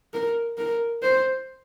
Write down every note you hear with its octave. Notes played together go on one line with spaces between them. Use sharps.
A#4
A#4
C5